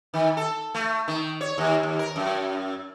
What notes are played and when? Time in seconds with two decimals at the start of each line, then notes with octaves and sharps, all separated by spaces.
0.14 D#3
0.37 A4
0.75 A3
1.08 D#3
1.41 C#5
1.58 D#2
1.83 D#2
1.99 A#4
2.16 F#2